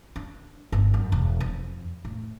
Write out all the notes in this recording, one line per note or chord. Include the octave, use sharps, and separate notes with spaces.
D4
G1
F#2
E1
F2
A2